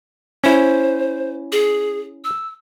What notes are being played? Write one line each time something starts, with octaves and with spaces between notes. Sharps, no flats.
C#4 E4 C5
G#4
E6